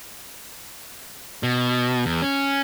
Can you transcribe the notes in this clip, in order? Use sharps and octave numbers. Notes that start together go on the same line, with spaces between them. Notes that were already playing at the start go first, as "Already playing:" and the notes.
B2
E2
C#4